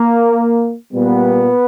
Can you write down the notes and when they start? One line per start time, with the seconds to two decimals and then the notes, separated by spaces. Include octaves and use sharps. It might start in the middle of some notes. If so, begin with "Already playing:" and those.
Already playing: A#3
0.92 A#2 G3 B3